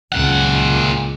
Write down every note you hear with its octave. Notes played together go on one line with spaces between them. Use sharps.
C#2 F#2 A#2 F#5